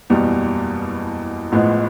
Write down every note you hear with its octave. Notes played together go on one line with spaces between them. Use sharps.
F#1 E2 B2 G3
A1 A2 F3 G#3 B3